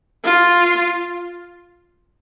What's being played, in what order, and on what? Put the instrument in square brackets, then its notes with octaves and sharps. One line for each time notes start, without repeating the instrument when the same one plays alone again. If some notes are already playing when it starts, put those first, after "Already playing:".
[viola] F4